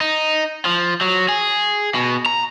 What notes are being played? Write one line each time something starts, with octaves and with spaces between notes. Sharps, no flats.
D#4
F3
F#3
G#4
B2
A#5